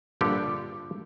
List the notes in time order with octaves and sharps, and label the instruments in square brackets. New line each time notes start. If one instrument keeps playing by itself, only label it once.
[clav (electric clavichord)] A#1 G2 D3 G3 G4 A4